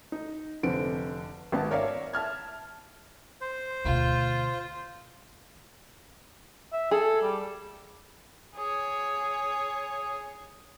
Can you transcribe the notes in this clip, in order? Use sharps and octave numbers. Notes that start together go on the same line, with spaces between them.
D#4
F1 D3 C4 D7
G#1 B3 A5
A#4 C#5 D5 E5 F5
E5 A5 F6 G#6
C5
D2 B2 F4
E5
G#4 A4
G3
G#4 C#5